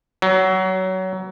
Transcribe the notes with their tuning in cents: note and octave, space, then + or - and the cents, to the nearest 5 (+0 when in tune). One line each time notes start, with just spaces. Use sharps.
F#3 +20